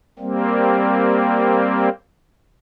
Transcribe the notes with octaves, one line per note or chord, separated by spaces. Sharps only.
G3 A#3 C4